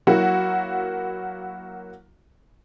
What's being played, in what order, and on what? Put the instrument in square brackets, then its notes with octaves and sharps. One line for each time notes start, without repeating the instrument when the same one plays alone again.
[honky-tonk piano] F#3 A#3 E4 F#4